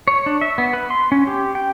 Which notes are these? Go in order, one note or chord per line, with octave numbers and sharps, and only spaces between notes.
C#5
D4
E5
B3
B4
C6
C#4
G4
G5